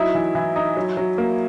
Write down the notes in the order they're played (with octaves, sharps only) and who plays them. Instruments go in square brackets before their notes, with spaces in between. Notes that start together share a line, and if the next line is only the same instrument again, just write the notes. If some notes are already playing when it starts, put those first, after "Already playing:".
Already playing: [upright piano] F#3 D#4 E4 E5
E3
E3
D#4
F#3
F#3
A#3